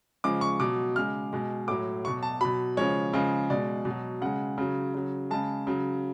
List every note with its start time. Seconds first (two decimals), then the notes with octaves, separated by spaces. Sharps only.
0.24 C#3 F3 G#3 D6
0.41 C#6
0.60 B2 F#3 D6
0.96 C#3 G#3 F6
1.33 B2 G#3
1.68 A2 F#3 D6
2.05 B2 F#3 C#6
2.23 A5
2.41 B2 F#3 B5
2.77 C#3 F3 G#3 C#5
3.13 C#3 F3 G#3
3.50 B2 G#3 D5
3.85 B2
3.91 F#3
4.21 C#3 G#3 F#5
4.58 C#3 F#3
4.94 C#3 F#3
5.30 C#3 G#3 A5
5.67 C#3 F#3